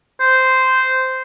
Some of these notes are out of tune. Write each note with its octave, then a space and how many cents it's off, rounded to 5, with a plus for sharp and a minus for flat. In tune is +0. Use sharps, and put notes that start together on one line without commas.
C5 -10